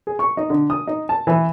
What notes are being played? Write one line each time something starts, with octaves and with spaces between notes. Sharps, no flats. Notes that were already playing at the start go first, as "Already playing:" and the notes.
G#4
C#6
D#4
D3
D#6
D#4
A5
E3